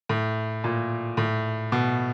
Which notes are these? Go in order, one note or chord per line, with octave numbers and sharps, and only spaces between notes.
A2
A#2
A2
B2